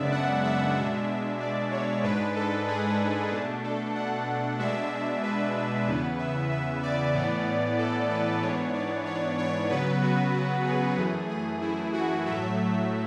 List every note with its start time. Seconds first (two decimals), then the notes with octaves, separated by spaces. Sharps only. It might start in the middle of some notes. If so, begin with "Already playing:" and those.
Already playing: F#2 C#3 G#3 B3 D4 D5 E5
0.12 F#5
0.44 E5
0.76 B2 G#3 D4 E5
1.40 D5
1.71 C#5
2.03 G#2 G#3 D4 B4
2.36 A4
2.68 G#4
3.31 B2 A3 D4
3.64 A4
3.95 F#5
4.59 B2 G#3 D4 E5
5.23 B4
5.87 E2 C#3 E3 B3 B4
6.19 E5
6.50 E5
6.83 D5
7.14 A2 E3 B3
7.78 A4
8.10 B4
8.42 G#2 E3 B3 D4 C#5
8.74 D5
9.06 C#5
9.38 C#5
9.69 C#3 F#3 B3 B4
10.02 F#4
10.34 F#4
10.65 G#4
10.97 F#2 E3 A3 G#4
11.29 G#4
11.61 E4
11.93 F#4
12.26 A2 F#3 A3 E5